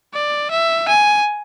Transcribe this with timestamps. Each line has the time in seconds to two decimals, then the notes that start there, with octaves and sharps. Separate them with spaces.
0.14 D5
0.51 E5
0.88 G#5